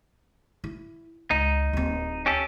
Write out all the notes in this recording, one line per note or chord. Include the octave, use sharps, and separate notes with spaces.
E4
C#2 D#4
D1 C4
C#4 G4 A4